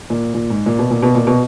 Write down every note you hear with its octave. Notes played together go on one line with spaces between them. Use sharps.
A#2
A#2
G#2
A#2
B2
A#2
B2
A#2
B2